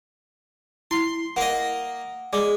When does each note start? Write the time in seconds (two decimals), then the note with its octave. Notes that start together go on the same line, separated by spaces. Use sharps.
0.91 E4 C6 C7
1.36 A#3 D#5 F#5
2.33 G#3 D5 D6